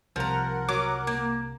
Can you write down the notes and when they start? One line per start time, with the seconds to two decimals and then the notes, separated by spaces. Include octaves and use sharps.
0.16 C2 C3 F3 A#4 F#5 A#5
0.69 F#3 D6
1.07 A#3